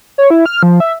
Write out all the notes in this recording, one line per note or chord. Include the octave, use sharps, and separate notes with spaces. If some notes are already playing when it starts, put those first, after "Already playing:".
C#5
E4
F6
F3
E5